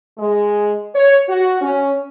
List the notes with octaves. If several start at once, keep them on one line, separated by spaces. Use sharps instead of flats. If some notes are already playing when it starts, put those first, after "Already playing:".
G#3
C#5
F#4
C#4